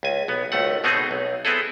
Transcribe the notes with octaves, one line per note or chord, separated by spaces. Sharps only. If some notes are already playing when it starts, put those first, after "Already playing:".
C#2 G#5
B1 B3
G#1 C#2 A3 F#5
B2 A3 B3 C4 D#4 G#4
B1
B3 C4 E4 G#4 A4